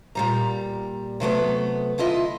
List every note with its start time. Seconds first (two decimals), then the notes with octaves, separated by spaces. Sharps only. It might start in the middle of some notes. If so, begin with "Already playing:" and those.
0.15 A#2 G3 A#5
1.20 C3 F#3 A3 B3
1.98 D3 E4 F4 D#5